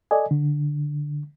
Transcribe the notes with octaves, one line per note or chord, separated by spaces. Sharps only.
A4 D5 D#5 G#5
D3